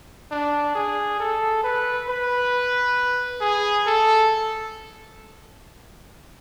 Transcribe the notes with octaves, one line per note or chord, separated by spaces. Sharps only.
D4
G#4
A4
B4
B4
G#4
A4